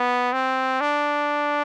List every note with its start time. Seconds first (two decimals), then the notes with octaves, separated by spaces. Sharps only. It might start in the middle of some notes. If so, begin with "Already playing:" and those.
Already playing: B3
0.33 C4
0.81 D4